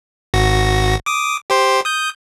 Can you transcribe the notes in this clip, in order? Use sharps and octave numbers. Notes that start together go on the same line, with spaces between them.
G#1 F#4 A#6
D6 D#6
G4 C5 C6
D#6 G6